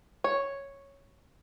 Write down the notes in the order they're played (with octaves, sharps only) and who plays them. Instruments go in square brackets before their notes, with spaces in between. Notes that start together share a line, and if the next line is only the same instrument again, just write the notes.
[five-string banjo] C#5